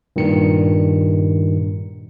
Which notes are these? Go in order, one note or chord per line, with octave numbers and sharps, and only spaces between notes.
G2 A#2 D#3 C#7